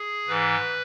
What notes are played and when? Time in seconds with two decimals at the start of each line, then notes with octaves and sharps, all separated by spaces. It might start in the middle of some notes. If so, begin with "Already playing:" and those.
Already playing: G#4
0.27 G#2 E3 B4